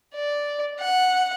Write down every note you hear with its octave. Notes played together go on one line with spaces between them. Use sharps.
D5
F#5